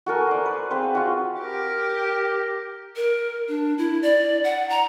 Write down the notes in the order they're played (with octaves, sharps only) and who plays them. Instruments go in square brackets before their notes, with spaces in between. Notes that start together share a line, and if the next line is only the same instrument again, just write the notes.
[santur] F#4 A4 A#4 G#5
C5 D5
B4
C4 G#4 B4 F5
F4 F#4
[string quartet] G4 [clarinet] A#4
[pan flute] A#4
D4
E4
D5
F#5
A#5